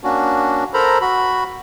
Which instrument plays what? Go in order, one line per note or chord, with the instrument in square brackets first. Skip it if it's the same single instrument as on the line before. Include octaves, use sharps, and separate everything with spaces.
[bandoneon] A#3 C#4 D4 F#4
A4 A#4 C5 A#5 B5
F#4 B5